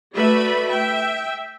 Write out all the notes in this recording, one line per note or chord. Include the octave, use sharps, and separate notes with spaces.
A3 F#4 B4 D5 E5 B5
E5 G5